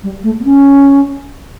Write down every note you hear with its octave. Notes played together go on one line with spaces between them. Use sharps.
G3
A3
B3
C#4